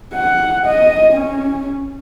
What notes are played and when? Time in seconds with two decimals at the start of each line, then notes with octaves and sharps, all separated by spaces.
0.14 F#5
0.66 D#5
1.13 C#4